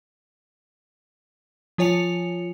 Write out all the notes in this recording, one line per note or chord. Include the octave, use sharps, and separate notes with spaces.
F3 F4 C#5 G#5 C#7 F7